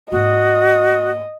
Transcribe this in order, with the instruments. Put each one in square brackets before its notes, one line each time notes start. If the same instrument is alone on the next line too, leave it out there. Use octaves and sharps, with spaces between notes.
[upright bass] G#2 A#3 [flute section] F#4 D#6 [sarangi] D#5